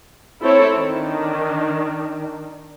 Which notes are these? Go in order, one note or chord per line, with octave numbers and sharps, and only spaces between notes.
C4 E4 A4 C5 C#5
D#3 D4